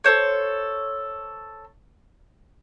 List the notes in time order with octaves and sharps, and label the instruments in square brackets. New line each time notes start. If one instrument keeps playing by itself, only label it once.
[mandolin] A4 C5 C#5